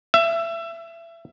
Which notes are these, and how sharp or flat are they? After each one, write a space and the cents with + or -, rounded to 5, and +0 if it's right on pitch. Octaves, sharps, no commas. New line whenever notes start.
E5 +25